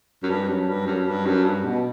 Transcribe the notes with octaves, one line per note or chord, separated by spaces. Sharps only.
F#2
G2
F#2
G2
F#2
G2
F#2
G2
B2